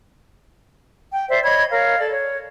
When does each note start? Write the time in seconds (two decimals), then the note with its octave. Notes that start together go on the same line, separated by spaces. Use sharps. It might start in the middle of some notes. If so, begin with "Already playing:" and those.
1.12 G5
1.29 C5 D5 E5
1.44 C#5 D#5 B5 G#6
1.71 A#4 C#5 F5
1.99 A4 D5
2.11 C#5